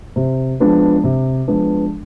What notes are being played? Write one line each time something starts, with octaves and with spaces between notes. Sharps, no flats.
C3
F3 G#3 B3 D4
C3
F3 G#3 B3 D4